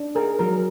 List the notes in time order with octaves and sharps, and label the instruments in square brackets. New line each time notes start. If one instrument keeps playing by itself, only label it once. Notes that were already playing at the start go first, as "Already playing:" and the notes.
Already playing: [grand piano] D4
[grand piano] G#4 [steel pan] A#4
[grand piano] F#3 [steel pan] A#4